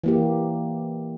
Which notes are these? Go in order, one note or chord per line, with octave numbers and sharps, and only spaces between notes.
E3 A#3 G4